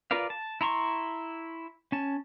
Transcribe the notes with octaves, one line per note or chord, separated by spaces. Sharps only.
F4 A#4 B4 D5 F5
A5
E4 A#5 C6 C#6
C#4 A5